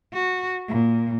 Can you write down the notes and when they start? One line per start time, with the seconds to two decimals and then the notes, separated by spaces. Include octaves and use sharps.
0.13 F#4
0.68 A#2